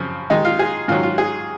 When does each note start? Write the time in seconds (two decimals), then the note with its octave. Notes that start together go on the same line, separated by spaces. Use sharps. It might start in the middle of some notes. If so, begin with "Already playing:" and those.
Already playing: F#2 C#3 F3 C4
0.30 D#3 G#3 D#4
0.45 F4
0.59 G#4
0.88 G#2 D#3 F#3 F4
1.03 F4
1.18 G#4